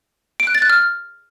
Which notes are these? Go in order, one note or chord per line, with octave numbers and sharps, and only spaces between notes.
D7
F#6
A6
F#6
F6